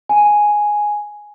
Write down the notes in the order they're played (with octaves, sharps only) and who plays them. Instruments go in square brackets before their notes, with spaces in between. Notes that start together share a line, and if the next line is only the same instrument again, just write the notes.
[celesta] G#5